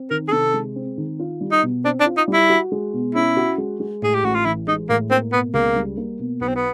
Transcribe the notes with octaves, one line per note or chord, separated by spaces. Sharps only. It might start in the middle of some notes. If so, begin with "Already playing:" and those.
Already playing: C4
D#3 A#4
G#4
C3 A4
G#3
C4
D#3
F4
G3
D#4
B2
C4 D4
D4
F4
D#4
G3
E4
F#4
G#3
B2
C#4 E4
F#4
G#3
G#3
A2 G#4
G4
A1 F#4
F4
E3 E4
G#3 D#4
A2 A#3
A#3 C4
B2 B3
C#2 A#3
G3
A#3
B2
B1 B3
C4
B3